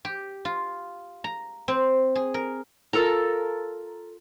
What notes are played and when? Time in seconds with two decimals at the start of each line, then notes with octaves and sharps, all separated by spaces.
0.05 G4
0.45 F4
1.24 A#5
1.68 C4
2.15 G#4
2.34 A#4
2.93 F4 A4 A#4 A#5